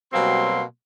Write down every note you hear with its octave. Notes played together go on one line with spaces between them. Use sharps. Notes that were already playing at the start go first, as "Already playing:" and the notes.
B2 F#3 G3 A#3 C4 C6